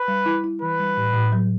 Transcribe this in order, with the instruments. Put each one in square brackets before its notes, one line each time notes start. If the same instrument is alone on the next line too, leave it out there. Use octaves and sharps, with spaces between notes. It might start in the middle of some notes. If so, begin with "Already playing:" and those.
Already playing: [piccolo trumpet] B4
[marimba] G3
E4
E4
[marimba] E3 [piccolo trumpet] B4
[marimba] G3
A2
A2
F#3